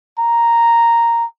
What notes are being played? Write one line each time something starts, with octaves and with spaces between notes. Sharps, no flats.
A#5